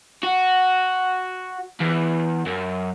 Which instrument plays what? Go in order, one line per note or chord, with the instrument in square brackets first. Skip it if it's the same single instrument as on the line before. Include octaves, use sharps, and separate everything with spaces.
[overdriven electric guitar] F#4
E2
F#2